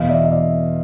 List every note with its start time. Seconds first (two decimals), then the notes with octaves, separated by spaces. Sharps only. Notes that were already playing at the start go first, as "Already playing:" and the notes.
Already playing: E2 B2 D#5 F5
0.09 D5 E5
0.24 D#5
0.31 D5 E5